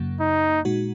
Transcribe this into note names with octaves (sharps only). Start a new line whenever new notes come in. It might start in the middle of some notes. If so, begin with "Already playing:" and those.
Already playing: F#2 C#3 F#3 A#3
D#4
A#2 G#3 D#4 F#4